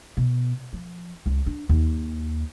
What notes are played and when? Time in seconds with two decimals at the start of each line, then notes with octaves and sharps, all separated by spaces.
0.17 B2
0.73 F3
1.26 C#2
1.46 D4
1.69 D#2